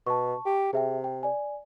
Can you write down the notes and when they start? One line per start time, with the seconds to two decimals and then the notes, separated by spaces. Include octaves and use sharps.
0.07 B2 A5 C#6
0.46 G4
0.73 C3 G#4 E5 G5
1.04 G5
1.23 D5 G#5